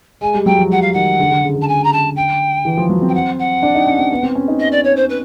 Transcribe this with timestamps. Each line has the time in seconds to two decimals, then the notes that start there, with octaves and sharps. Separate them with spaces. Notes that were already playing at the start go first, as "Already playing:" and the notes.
0.21 G#3 G#5
0.34 G3
0.45 F#3 G5
0.59 F3
0.70 G3 F#5
0.82 F5
0.93 D#3 F#5
1.19 D3
1.31 D3
1.43 C#3
1.55 D3
1.61 A5
1.68 G#5
1.84 A#5
1.92 A5
2.16 G5
2.65 E3
2.77 F3
2.89 F#3
3.02 C4
3.08 G5
3.14 F#5
3.39 F#5
3.63 D4
3.75 D#4
3.87 C#4
3.99 C4
4.11 B3
4.23 C4
4.35 C#4
4.48 D#4
4.59 D#5
4.71 D5
4.84 C#5
4.96 C5
5.09 B4